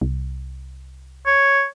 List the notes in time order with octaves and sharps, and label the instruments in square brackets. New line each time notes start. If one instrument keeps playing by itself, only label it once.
[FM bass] C2
[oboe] C#5